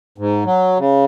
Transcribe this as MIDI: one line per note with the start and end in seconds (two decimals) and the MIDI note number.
0.18 0.44 44
0.45 0.78 54
0.79 1.05 49